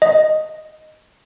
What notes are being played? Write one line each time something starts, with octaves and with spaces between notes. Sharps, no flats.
D#5